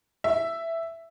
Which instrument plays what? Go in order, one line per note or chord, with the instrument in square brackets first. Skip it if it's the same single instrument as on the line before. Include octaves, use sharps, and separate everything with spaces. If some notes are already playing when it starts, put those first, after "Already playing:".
[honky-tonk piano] E5